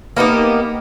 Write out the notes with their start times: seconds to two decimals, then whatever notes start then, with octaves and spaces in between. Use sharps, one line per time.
0.17 A#3 B3 D#4 G4